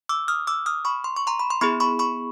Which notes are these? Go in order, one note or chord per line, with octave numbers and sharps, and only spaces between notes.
D6 E6
D#6 F6
D6 E6
D#6 F6
B5 C#6
C6
C#6
A#5 C6
B5
C6
B3 E4 G#4 B5 C#6
B5 C#6
B5 C#6